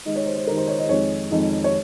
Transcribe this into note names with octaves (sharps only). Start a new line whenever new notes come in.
D#3 G#3 D#4 D#5
C#5
C5
C5
D#3 G#3 D#4 A#4
C5
C#5
D#5
F2 D#3 G#3 D#4 C#5
F2 D#3 G#3 D#4
C#5